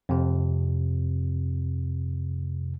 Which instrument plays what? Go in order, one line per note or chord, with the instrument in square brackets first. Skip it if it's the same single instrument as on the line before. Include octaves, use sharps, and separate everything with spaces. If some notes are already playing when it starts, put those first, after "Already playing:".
[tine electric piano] F2 C3